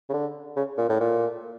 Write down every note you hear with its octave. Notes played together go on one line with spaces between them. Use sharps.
C#3
D3
C#3
A#2
A2
A#2